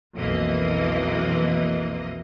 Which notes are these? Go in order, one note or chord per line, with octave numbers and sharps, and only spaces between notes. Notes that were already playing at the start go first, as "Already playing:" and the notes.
B1 F2 E3 A#3 D#5